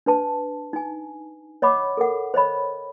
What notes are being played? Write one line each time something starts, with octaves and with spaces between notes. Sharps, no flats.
D4 B4 A5
D#4 G#5
C#5 D#5 F#5 B5 D6
A4 A#4 F#5
C5 C#5 D#5 B5